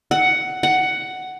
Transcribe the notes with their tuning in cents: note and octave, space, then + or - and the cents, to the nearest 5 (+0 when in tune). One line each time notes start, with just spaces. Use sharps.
F#5 +10
F#5 +10